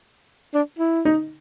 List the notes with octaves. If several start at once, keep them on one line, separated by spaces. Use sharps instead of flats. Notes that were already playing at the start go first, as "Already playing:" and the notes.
D4
E4
D#4